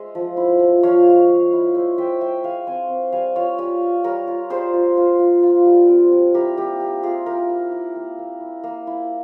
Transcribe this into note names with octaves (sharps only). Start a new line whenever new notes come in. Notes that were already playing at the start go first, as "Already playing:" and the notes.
Already playing: G#3 C5 E5
F3
E4
F3
F3 C#5 F5
G#3
G#3
E4
G#3 C5 E5
G#3 E5 G5
G#3 E5 G5
G#3 F5 G#5
C4 G#5 C6
C4
G3 F5 G#5
F4 C#5 F5
G3 F5 G#5
F4
G3 A#4 C#5
F4
G3 G#4 C5
F4
F4
F4
F4
G3
C4
G3
E4 G4 A#4
A#3 G4
A#3 G4
E4 F4 G#4
E4 G4 A#4
E4
E4
A#3
A#3
E4
A#3
E4